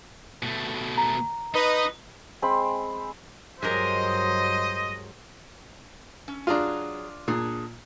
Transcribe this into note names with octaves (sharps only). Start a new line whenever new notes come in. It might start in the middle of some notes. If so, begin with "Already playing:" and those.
B2 A3
A#5
D#4 B4 D#5
G#3 C4 B5 C6
G2 F#3 G#3 G4 A#4 C5 D#5
C#4
F#3 D4 F4 G#4 A#5
A#2 D4 G#4